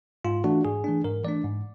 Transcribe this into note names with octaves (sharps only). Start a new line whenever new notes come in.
G#2 F4
E3 A3 D4 F#4
G#2 G#4
E3 A3 D4
G#2 A#4
E3 A3 D4 D5
G#2